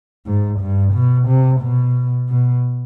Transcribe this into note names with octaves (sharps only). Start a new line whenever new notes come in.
G#2
G2
B2
C3
B2
B2